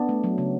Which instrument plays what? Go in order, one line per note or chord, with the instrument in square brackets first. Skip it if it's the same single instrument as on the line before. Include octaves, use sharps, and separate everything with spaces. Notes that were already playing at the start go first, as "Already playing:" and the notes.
Already playing: [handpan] B3 D4
A3
F#3
C#3